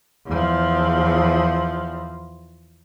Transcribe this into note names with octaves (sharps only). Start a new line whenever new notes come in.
E2 F3